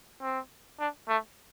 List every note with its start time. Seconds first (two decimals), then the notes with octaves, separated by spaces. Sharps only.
0.22 C4
0.79 D4
1.08 A3